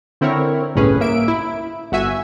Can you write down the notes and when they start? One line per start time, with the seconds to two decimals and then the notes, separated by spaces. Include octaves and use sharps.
0.21 D3 C4 E4 A#4 C#5
0.75 G1 C2 A2 C#4 G#4 B4
1.00 A#3 E5 D7
1.28 E4
1.92 G1 F#4 E5 G#5